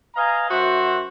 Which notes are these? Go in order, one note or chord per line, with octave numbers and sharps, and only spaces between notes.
B4 D#5 F5 G#5 A#5
F#2 F#4 C5 E5 F#5